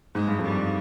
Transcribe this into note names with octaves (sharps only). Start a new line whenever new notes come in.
G#2 G#3
G2
F2
G3
G2